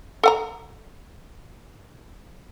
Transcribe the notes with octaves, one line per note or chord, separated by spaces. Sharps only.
A4 F#5 A#5